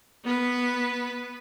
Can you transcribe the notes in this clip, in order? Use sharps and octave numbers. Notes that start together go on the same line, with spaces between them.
B3 B4